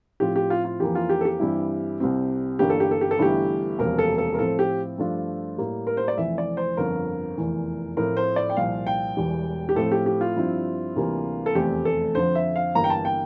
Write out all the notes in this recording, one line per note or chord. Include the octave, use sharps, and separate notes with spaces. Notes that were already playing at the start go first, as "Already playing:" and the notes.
A2 F3 C4 F4 G4
G4
F4
F4
F2 E3 A#3 G4
F4
G4
A4
G4
G2 E3 G3 C4 E4
C2 C3 G3 C4
G1 G2 E3 A#3 D4 G4
A4
G4
A4
G4
A4
G1 G2 E3 A3 E4 G4
E1 D2 C3 F3 A#3 A#4
A4
A4
A#4
A2 F3 C4 A4
G4
G2 F3 A3 D4 F4
A2 G3 A#3
A#4
C5
D5
F1 F2 E3 E5
D5
C5
G1 F2 D3 A#4
F1 E2 E3
A2 F3 A3 C4 A#4
C5
D5
G5
C2 A#2 F3 F5
G5
E1 E2 E3 G3
G4
A2 F3 A3 C4 A4
G4
G4
F4
G2 F3 C4 E4
D2 C3 E3 G3 A#3
A4
F1 E2 E3 A3 C4 G4
A4
F2 D3 F3 C5
E5
F5
G1 G2 E3 A#3 A#5
G5
A5
G5